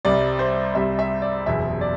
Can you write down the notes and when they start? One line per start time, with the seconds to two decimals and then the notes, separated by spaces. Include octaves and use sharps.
0.05 C2 C3 G3 D5
0.39 C5
0.75 C2 C3 G3 E5
0.99 E5
1.22 D5
1.46 F#1 E2 B2 E5
1.81 D5